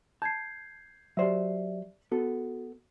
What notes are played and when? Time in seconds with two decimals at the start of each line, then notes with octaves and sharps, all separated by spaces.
0.22 A5 G6 G#6 C7
1.17 F#3 G4 C5 D5 E5
2.12 B3 F#4 A4